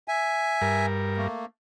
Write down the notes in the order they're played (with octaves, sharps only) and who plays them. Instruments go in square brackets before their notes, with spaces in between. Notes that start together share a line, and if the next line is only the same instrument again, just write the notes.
[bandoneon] E5 G#5
[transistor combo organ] G2 A#4
[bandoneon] A3 A#3